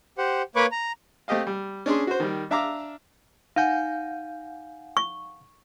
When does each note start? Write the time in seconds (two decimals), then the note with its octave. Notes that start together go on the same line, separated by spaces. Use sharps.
0.18 G4 C5 F#5
0.56 A#3 B4 C#5 B5 C#6 D6
0.72 A#5
1.28 A3 C4 G4 D#5 F5
1.47 G3
1.86 C#4 D4 G#4 C6
2.07 F#4 C5
2.20 D#3 G3
2.51 D4 E5 F5 A#5 D6
3.56 D#4 F5 F#5 G#5 G6
4.97 C#6